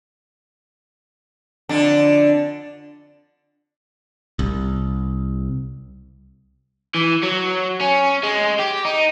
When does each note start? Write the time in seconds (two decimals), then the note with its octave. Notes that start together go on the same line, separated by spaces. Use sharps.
1.69 F2 D3 D4
4.39 C2
6.95 E3
7.23 F#3
7.81 C#4
8.23 G#3
8.59 G4
8.85 D#4